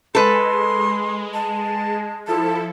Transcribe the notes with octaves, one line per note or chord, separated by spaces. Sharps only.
G#3 A4 B4 C6
A5
F3 E4 A4 A5